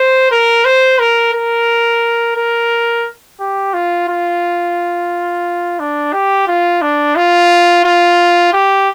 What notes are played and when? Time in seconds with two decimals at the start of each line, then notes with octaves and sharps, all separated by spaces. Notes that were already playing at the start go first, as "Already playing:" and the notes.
Already playing: C5
0.31 A#4
0.65 C5
1.00 A#4
1.33 A#4
2.36 A#4
3.40 G4
3.74 F4
4.08 F4
5.79 D4
6.13 G4
6.47 F4
6.82 D4
7.16 F4
7.84 F4
8.53 G4